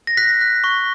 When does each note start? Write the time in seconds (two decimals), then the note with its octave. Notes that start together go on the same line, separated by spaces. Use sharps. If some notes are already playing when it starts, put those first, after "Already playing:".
0.07 A#6
0.17 F#6 B6
0.41 F#6
0.64 C#6